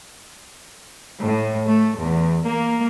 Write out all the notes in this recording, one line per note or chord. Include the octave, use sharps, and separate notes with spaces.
A2
A3
E2
A#3